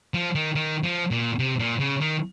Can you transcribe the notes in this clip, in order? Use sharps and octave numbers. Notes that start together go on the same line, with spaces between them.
F3
D#3
D#3
F3
A#2
C3
A#2
C#3
D#3